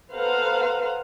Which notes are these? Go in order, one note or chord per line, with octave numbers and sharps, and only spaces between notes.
A4 B4 C5 F5 F#5 A#5